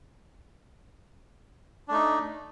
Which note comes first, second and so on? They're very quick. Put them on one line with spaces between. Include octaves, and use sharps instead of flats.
D4 A3 D#4